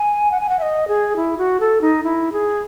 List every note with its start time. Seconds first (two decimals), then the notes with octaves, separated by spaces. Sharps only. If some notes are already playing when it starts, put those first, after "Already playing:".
Already playing: G#5
0.31 F#5
0.40 G#5
0.49 F#5
0.59 E5
0.62 D#5
0.88 G#4
1.16 E4
1.38 F#4
1.60 A4
1.81 D#4
2.04 E4
2.32 G#4